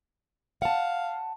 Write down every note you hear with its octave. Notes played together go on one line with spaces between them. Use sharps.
F5 F#5 A5